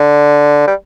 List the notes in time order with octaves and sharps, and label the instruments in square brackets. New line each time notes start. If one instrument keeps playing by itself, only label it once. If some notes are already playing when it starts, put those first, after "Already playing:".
Already playing: [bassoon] D3
G3